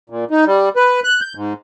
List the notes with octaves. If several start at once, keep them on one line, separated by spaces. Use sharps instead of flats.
A#2
D#4
G3
B4
F#6
G6
G#2